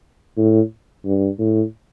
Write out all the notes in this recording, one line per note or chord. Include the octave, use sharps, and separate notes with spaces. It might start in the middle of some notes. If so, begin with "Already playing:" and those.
A2
G2
A2